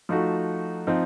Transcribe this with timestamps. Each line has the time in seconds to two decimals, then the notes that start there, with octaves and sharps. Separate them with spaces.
0.09 F3 A3 D#4 F#4
0.87 F3 C4 D#4